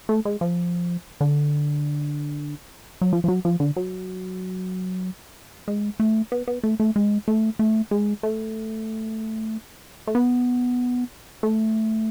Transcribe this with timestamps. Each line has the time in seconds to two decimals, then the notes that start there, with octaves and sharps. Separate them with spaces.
0.09 A3
0.25 G#3
0.41 F3
1.21 D3
3.02 F#3
3.13 F3
3.24 F3
3.28 F#3
3.45 F3
3.60 D3
3.76 F#3
5.68 G#3
6.00 A3
6.32 B3
6.48 B3
6.63 A3
6.80 A3
6.96 G#3
7.28 A3
7.59 A3
7.91 G#3
8.23 A3
10.07 A3
10.15 B3
11.43 A3